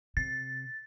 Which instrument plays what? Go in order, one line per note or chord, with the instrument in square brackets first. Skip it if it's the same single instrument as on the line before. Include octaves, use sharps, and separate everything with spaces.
[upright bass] C3 [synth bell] A6